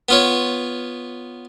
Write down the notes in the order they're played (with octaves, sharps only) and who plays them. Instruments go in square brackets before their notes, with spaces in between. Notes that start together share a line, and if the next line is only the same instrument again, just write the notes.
[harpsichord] B3 F4 C#5